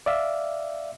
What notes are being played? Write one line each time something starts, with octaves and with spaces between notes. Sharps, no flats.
D5 E5 F5